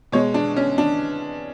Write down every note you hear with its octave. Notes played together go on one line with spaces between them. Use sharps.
B2 G#3 C#5
D4
C#4
D4